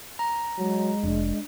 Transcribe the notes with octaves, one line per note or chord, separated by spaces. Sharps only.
A#5
F#3 G#3
F1 D4